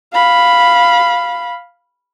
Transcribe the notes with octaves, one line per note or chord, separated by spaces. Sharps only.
F5 B5